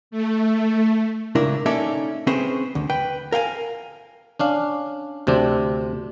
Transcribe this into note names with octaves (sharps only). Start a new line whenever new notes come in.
A3
C#2 D4 E4 A#4
A#3 C#4 D#4 A4 D5 E5
C4 C#4 G#4 B4 C5
D2
B4 G5
A#4 F5 G5 G#5
C#4 D4 F5
D2 C3 C4 D4